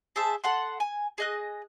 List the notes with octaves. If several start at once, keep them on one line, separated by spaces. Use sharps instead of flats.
G#4 C5 E5 A5
A4 F#5 C6
G#5
G#4 D#5 F#6